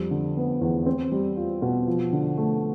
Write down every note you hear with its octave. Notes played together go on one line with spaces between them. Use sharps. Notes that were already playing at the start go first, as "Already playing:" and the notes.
Already playing: F2 G3
D3
B3
E2
C4
G3
F4
B2
F3
D3
A3